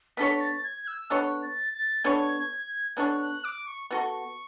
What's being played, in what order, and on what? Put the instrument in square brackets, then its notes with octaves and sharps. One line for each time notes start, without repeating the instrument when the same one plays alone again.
[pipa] B3 D4 A4 C#5 [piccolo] B6
[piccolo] A6
G#6
E6
[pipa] B3 D4 A4 C#5 [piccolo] F#6
[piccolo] A6
A6
[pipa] B3 D4 A4 C#5 [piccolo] G#6
[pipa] B3 D4 A4 C#5 [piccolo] F#6
[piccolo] F#6
D6
C#6
[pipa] B3 F#4 A4 [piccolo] C#6